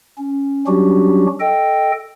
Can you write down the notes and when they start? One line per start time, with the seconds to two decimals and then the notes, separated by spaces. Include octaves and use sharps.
0.18 C#4
0.67 F#3 G3 C#4 D4 F#4 G4
1.40 A4 D#5 G5